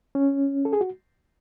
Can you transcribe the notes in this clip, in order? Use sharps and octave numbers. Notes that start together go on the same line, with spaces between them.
C#4
A4
G#4
F#4